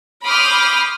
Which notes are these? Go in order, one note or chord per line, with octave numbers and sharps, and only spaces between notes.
B5 C6 D6 D#6 F6 G6